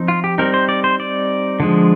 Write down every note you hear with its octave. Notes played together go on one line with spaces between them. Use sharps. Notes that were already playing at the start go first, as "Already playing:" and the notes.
Already playing: F3 C4 D#4
F4
G4
G3 C4 D#4 A#4
C5
D5
C5
D5
D3 F3 G#3